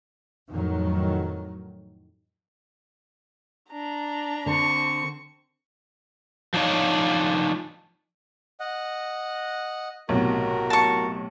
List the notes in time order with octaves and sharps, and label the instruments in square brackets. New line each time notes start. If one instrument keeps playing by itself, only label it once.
[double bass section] F2 A2 D#3 F#3
[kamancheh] D4 A#5
[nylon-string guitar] D3 [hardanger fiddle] C4 C#6
[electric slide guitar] F3 D4 D#4 C#5 F5
[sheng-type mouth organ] D#5 F#5
[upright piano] B1 A2 C3 [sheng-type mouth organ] F#4 A#4
[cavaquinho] A5 C#6